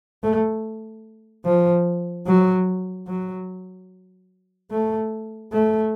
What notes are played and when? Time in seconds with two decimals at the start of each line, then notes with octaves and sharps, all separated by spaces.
0.23 A3
1.45 F3
2.26 F#3
3.07 F#3
4.71 A3
5.53 A3